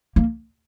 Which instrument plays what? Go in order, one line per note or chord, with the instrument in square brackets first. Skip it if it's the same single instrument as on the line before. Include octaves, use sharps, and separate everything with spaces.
[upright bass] A#3